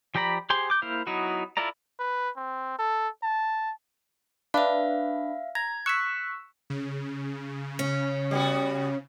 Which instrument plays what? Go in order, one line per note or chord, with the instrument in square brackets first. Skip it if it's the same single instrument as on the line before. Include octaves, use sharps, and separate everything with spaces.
[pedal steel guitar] F3 G4 D5 A#5 B5
G4 G#4 C5 C6
D6 G6
A#3 E4 C5 F5
F#3 B3 D#4 E4 F#4
E4 F4 A4 D5 A#5
[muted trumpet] B4
C4
A4
A5
[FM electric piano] D4 B4 [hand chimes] E5 F5
[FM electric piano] A#5 [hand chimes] G#6
[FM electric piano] C#6 E6 [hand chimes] F#6 B6
[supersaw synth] C#3
[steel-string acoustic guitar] C#4
[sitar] G3 B3 F#4